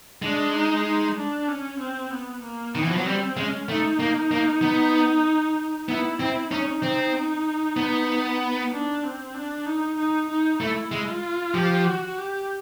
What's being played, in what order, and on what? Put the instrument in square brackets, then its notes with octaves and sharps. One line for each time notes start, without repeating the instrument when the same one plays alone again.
[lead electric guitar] G#3 [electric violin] D4
[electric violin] D#4
D#4
D4
C#4
C4
B3
A#3
[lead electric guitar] D#3 [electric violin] B3
[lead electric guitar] E3
F3
F#3
[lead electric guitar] G3 [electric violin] C4
[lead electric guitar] G#3 [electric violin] C#4
[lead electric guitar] A3 [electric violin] D#4
[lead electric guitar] A#3
A#3
B3
[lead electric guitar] B3 [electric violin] E4
[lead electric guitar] C4 [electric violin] E4
[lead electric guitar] C#4 [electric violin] D#4
[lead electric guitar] C4
B3
[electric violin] D4
C4
D4
D#4
D#4
D#4
[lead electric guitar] A3 [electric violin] E4
[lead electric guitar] G#3
[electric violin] F4
[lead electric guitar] F3 [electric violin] G4
[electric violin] F#4
G4